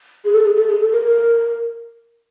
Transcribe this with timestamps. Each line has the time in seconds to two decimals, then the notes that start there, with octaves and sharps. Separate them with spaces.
0.25 G#4
0.33 A4
0.44 G#4
0.56 A4
0.68 G#4
0.80 A4
0.92 A#4
1.04 A#4